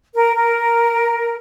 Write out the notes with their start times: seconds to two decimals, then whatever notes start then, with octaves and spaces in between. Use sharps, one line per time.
0.14 A#4
0.35 A#4